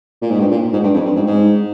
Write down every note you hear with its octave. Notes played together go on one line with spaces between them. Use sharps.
A#2
G#2
G2
A#2
G#2
G2
F2
G2
G#2
G#2